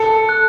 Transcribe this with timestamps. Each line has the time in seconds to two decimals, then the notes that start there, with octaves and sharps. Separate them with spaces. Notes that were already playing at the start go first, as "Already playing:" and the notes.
Already playing: A4
0.29 F#6